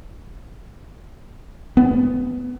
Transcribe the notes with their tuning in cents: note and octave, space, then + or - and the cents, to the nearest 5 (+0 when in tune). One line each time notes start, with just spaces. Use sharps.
B3 +15